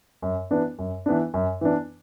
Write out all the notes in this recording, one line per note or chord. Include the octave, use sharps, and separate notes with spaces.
F#2
E3 B3 D4
F#2
E3 B3 D4
F#2
E3 B3 D4